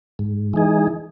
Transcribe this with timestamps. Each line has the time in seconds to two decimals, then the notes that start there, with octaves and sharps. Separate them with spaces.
0.19 G#2
0.53 E3 G#3 D#4 G#4